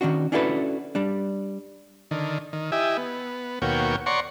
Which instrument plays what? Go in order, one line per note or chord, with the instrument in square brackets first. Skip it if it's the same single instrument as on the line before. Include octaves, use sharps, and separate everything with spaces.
[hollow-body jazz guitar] D#3 C#4 D4 F#4
C#4 D4 E4 F#4 A4 B4
G3 D4
[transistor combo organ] D3 D#3
D#3
E4 G4 D#5 E5 G#5
B3
D#2 B2 A#3 F#4 C#5 G5
C#5 D5 F#5 A#5 C6 C#6